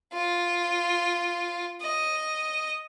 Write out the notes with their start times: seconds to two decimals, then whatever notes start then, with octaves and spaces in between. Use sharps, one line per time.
0.13 F4
1.82 D#5